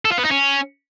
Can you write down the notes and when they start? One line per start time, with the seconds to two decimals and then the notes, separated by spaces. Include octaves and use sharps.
0.05 A4
0.12 F4
0.18 B3
0.25 D#4
0.31 C#4